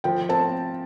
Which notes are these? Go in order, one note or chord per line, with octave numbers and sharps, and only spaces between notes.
F3 G5
C4 A5